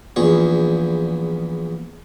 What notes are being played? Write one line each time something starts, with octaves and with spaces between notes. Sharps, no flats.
A#1 E2 G#4